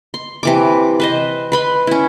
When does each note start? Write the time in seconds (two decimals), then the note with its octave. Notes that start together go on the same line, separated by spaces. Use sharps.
0.14 C6
0.43 C3 E3 D6
1.00 B4 C5 D#5
1.52 B4 B5 C6
1.87 C#4 E4